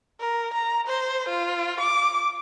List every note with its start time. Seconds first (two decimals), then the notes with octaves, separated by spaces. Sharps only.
0.20 A#4
0.54 A#5
0.88 C5
1.29 F4
1.80 D6